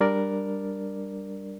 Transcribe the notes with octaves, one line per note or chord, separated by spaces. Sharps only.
G3 D4 A#4 D5